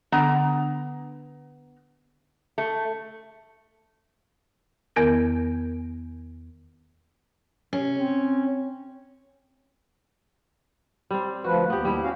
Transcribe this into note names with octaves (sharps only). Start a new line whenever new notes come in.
D3 B3 A#5
A3
E2 D#3 B3 A#4 G6 G#6
C3 C#4
C4
G3 C4
D2 F3 F#4 B4
D#2 B3 G4
G3 E4
C#4 F#4 F5